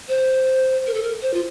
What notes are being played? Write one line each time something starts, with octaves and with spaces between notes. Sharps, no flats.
C5
A#4
A4
A#4
C5
F4